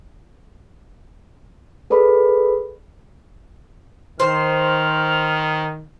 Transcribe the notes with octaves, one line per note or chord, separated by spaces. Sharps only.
G#4 A4 B4 D5 B5
D#3 C5 F6